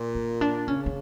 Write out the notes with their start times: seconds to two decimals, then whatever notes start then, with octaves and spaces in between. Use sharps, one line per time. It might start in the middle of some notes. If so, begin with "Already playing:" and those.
Already playing: A#2
0.15 C#4
0.41 D4
0.68 C#3 C#4
0.86 C#4